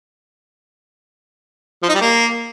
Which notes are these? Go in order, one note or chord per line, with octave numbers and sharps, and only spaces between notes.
F3
D#4
G3
A#3